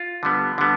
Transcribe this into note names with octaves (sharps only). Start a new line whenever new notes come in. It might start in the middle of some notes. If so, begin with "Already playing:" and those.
Already playing: F4
D3 G3 B3
D3 G3 B3